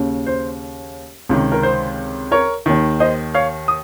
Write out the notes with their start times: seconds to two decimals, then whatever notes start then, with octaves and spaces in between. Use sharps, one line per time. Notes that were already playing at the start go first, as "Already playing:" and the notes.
Already playing: D#2 C#3
0.27 C5
1.29 C#2 C3 D#3
1.52 A#4
1.63 C5
2.32 A#4 C#5
2.66 D#2 D#3
3.00 C5 D#5
3.34 C#5 F5
3.68 D#6